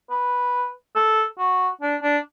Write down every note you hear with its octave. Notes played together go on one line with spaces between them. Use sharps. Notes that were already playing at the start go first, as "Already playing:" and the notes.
B4
A4
F#4
D4
D4